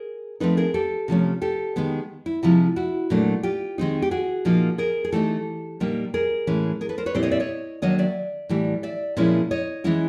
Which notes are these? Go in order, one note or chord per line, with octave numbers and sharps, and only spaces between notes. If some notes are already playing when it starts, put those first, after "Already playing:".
Already playing: G#4 A#4
F3 A3 C4 D#4 A4 B4
G#4 A#4
G4 A4
C3 F3 A3 C#4
G4 A4
D#3 G#3 B3
E4
C3 F3 G#3 E4
E4 F#4
A#2 F#3 A3 D4
F4 G4
D#3 G#3 C4 D#4
G4
F#4 G#4
A#2 F3 A#3 D#4
G#4 A#4
G#4
E3 A3 C4 D#4 G4 A4
A#2 G3 A#3 D#4
G#4 A#4
A2 E3 G#3 C#4
G#4 A#4
A4 B4
A#4 C5
B4 C#5
A#2 G3 C4 E4 C5 D5
C#5 D#5
D5 E5
C#5 D#5
D#3 F#3 A#3 D4 C#5 D#5
D5 E5
A2 E3 G3
D5 E5
A#2 F3 G#3 C#4 E4
C#5 D#5
E3 G#3 C#4 E4